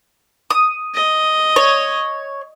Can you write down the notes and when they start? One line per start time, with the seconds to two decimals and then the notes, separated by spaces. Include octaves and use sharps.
0.50 D#6
0.94 D#5
1.56 C#5